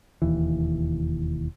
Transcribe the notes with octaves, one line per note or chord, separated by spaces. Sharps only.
E1 D#2 E3